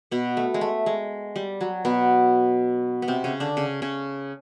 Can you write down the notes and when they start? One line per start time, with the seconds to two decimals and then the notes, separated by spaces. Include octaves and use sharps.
0.11 B2 B3
0.37 A3
0.54 G#3
0.61 A3
0.86 G#3
1.36 G3
1.61 F#3
1.85 B2 B3
3.02 B3
3.08 C3 C4
3.24 C#3 C#4
3.40 D3 D4
3.57 C#3 C#4
3.82 C#3 C#4